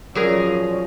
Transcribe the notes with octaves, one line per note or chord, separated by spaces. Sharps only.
F3 F#3 C#4 G#4 A#4 D5